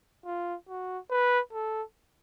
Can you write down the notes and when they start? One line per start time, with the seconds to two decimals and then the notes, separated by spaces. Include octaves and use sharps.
0.26 F4
0.69 F#4
1.10 B4
1.53 A4